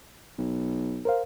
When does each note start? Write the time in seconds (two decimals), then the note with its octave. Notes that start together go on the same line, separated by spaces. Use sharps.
0.38 B1
1.05 A#4 C5 F5